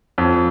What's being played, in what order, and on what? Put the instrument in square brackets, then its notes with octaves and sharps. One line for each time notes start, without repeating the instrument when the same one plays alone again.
[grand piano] F2